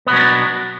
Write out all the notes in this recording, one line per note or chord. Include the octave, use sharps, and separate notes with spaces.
B2 F#3 B3 C#4 D4